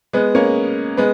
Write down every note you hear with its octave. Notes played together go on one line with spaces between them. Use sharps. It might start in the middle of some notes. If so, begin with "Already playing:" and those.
G#3 B3
A#3 C#4
G#3 B3